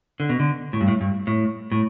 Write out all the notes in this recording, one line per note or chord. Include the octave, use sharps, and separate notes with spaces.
D3
B2
D3
A2
G2
A2
G2
A2
A2